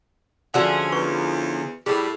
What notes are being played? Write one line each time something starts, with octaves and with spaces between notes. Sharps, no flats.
D3 F3 A3 C#4 F#4 G#4 D5 F#5
E2 B4 C#6
A2 G3 G#4